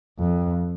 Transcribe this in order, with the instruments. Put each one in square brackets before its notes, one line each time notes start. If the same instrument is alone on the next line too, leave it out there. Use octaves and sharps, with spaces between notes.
[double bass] F2